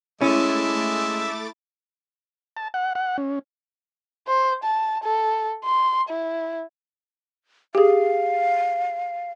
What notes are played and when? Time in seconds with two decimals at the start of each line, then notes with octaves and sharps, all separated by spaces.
0.21 G#3 A3 C#4 E4 E5 D6 A6
2.57 A5
2.74 F#5
2.95 F#5
3.18 C#4
4.27 C5
4.64 A5
5.04 A4
5.64 C6
6.09 E4
7.75 G4 G#4 F5